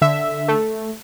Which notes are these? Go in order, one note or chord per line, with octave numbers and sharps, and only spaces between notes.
D3 E5
A3